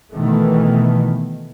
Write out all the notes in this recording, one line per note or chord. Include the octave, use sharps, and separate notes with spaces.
B2 D#3 E3 A3